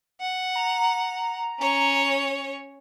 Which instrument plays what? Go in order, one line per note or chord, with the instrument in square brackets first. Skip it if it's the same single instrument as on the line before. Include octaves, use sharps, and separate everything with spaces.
[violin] F#5
[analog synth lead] A#5
[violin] C#4 C#5